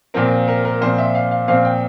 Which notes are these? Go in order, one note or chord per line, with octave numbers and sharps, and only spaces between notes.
A#2 F3 C4 A#4
A#4
A#4
A#2 F3 C4 C5
E5
F5
F5
A#2 F3 C4 F5
G5